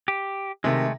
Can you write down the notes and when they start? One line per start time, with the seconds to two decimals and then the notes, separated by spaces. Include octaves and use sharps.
0.08 G4
0.64 C3 D#3 G#3 A3 A#6